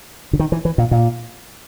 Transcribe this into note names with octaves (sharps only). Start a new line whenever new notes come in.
D3
D#3
E3
E3
A#2
A#2